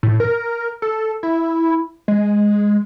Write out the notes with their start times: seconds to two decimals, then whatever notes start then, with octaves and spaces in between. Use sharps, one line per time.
0.03 A2
0.20 A#4
0.82 A4
1.23 E4
2.08 G#3